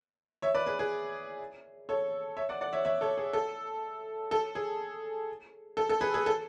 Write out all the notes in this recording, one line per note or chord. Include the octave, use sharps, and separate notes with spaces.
C#5 E5
B4 D5
G#4 B4
G#4 B4
A4 C#5
C#5 E5
D5 F#5
D5 F#5
C#5 E5
C#5 E5
A4 C#5
G#4
A4
A4
G#4
A4
A4
G#4 B4
G#4 B4
A4